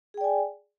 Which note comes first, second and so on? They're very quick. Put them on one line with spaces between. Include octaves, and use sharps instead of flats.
G#4 G5 D5 G#5